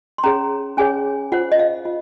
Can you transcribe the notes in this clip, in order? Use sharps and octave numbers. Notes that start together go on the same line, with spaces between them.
C6
C#4 G#4 C#5 A#5
C#4 G#4 C#5 G#5
F4 C5 F#5
D#5
F5
F4